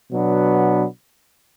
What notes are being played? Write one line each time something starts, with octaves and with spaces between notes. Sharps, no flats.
B2 F#3 B3 D4